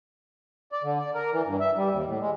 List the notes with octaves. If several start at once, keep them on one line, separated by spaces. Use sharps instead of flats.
D5
D3
D5
A#4
E3
G2
E5
G3
D#2
A2
G#3